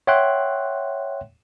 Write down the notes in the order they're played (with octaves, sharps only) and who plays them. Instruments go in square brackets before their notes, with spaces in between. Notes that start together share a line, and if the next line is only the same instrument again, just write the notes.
[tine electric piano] C#5 E5 F#5 G5 C6 F#6